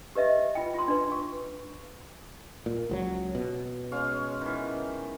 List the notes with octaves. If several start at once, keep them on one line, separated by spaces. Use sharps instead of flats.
G4 B4 D#5 E5
F4 G5
F4 C6
D4 B4
C#6
A#2
C#2 F3 F#3
B2
G#3 C#4 F5
D#3 E3